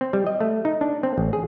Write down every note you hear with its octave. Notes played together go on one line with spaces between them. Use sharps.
C4
G3
D#5
A3
D#4
D4
C4
A1
G#4